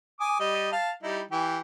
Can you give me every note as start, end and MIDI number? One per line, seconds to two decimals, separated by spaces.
0.20 0.38 80
0.20 0.38 86
0.20 0.38 87
0.40 0.71 55
0.40 0.71 75
0.72 0.91 77
0.72 0.91 81
1.03 1.21 55
1.03 1.21 63
1.03 1.21 64
1.31 1.59 52
1.31 1.59 67